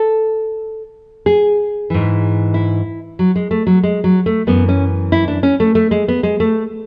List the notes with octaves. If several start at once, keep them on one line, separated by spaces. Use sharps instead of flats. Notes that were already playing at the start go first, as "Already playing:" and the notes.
Already playing: A4
G#4
G#2 E3
E4
F#3
G#3
A3
F#3
G#3
F#3
A3
F#2 E3 B3
C#4
E4
D4
C#4
A3
A3
G#3
B3
G#3
A3